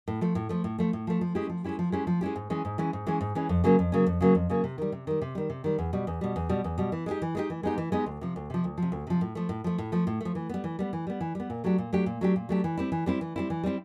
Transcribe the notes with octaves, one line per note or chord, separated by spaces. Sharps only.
A2
F3 A3
A2
F3 A3
A2
F3 A3
A2
F3 A3
F3
G#3 C#4 E4 G4
F3
G#3 C#4 E4 G4
F3
G#3 C#4 E4 G4
F3
G#3 C#4 E4 G4
G#2
E3 G#3 C#4
G#2
E3 G#3 C#4
G#2
E3 G#3 C#4
G#2
E3 G#3 C#4
F2
C#3 F#3 A#3 C#4
F2
C#3 F#3 A#3 C#4
F2
C#3 F#3 A#3 C#4
F2
C#3 F#3 A#3 C#4
C3
D#3 G3
C3
D#3 G3
C3
D#3 G3
C3
D#3 G3
E2
B2 G3
E2
B2 G3
E2
B2 G3
E2
B2 G3
E3
G#3 B3 D#4 G4
E3
G#3 B3 D#4 G4
E3
G#3 B3 D#4 G4
E3
G#3 B3 D#4 G4
D2
C3 F3
D2
C3 F3
D2
C3 F3
D2
C3 F3
A2
F3 A3
A2
F3 A3
A2
F3 A3
A2
F3 A3
E3
G3 B3
E3
G3 B3
E3
G3 B3
E3
G3 B3
A#2
F#3 A3 D4 G4
A#2
F#3 A3 D4 G4
A#2
F#3 A3 D4 G4
A#2
F#3 A3 D4 G4
E3
G3 C4 E4
E3
G3 C4 E4
E3
G3 C4 E4
E3
G3 C4 E4